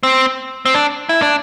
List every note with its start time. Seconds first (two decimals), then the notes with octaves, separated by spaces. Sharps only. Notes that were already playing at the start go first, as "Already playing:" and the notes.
0.03 C4
0.65 C4
0.75 D4
1.09 E4
1.22 D4